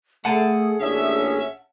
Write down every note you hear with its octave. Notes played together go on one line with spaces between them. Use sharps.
A3 G#4 F#5 A5
A1 A#2 C#4 D4 E5